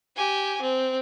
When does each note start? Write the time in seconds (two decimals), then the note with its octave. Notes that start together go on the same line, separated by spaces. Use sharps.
0.16 G4 G#5
0.61 C4